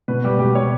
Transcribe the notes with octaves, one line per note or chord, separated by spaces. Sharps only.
B2 B4
G3 G4
B2 G4
G3 C#5